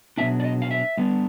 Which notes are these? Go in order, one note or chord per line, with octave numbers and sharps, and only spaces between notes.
B2 F#3 B3 D4 E5
D5
D#5
F5
E5
D3 G3 B3 D4